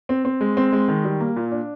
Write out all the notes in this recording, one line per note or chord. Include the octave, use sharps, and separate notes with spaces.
C4
C4
G#3
C4
G#3
D#3
G3
A#3
A#2
D4